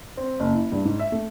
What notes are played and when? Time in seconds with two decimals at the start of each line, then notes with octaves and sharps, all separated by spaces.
0.17 C4
0.40 F#1
0.54 E4
0.72 G2
0.85 G#2
0.99 E5
1.12 A3